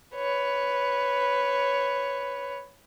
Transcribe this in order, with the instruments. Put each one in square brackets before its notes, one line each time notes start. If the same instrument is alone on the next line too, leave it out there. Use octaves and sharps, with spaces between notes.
[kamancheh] B4 C#5